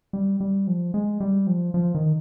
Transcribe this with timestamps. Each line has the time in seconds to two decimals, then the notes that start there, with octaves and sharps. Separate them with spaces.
0.13 G3
0.40 G3
0.67 F3
0.94 G#3
1.20 G3
1.47 F3
1.74 F3
1.95 D#3